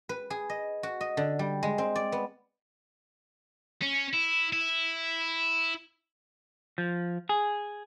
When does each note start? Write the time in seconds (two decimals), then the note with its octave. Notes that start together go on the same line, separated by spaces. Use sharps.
0.09 B4
0.30 G#4
0.50 D#5
0.83 F#4
1.01 D#5
1.17 D3
1.39 G3
1.63 G#3
1.78 C4
1.96 D5
2.12 B3
3.82 C#4
4.13 E4
4.53 E4
6.78 F3
7.29 G#4